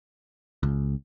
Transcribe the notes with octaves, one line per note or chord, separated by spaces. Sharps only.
C#2